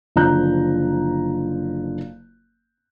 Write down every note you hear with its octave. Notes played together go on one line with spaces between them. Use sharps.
F#1 D3 F3 A#5 F#6 G6